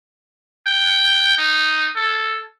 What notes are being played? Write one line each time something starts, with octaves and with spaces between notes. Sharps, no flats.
G5
D#4
A4